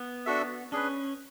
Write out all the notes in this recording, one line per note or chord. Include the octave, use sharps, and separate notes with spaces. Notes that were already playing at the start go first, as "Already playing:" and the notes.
Already playing: B3
D4 F#4 A4 E5
C#4 D4 G#4 B4